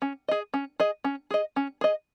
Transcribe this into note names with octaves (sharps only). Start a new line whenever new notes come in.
C#4
G#4 D#5
C#4
G#4 D#5
C#4
G#4 D#5
C#4
G#4 D#5